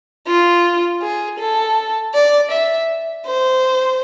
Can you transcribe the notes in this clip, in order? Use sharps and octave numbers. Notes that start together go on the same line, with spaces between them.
F4
G#4
A4
D5
E5
C5